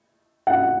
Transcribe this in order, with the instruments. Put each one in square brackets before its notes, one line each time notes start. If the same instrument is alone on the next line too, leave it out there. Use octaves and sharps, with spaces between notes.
[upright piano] F#5